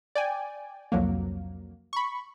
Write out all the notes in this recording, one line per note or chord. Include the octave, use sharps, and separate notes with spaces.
D5 G5 G#5
C2 F2 F#3 A#3
B5 C#6